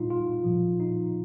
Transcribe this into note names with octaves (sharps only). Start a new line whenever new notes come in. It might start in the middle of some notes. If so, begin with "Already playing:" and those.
Already playing: A#2 G3 D#4 F4
F4
A#2 F3
D#4